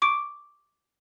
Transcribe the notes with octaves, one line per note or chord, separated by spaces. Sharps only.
C#6 D6 D7